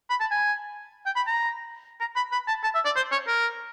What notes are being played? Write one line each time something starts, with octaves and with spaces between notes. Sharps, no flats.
B5
A5
G#5
G5
B5
A#5
A#5
B5
B5
A5
A5
E5
D5
C5
C#5
A#4